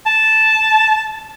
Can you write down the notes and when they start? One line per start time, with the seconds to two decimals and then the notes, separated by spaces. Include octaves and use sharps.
0.07 A5